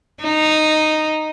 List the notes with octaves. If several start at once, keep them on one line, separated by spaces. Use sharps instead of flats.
D#4